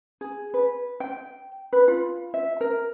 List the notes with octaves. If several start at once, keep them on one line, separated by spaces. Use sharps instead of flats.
G#4
B4
G5
B4
F4
E5
A#4